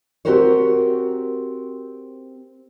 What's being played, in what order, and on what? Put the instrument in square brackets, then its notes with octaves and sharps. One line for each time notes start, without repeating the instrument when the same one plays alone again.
[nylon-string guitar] C4 F#4 G4 A#4 C5 C#5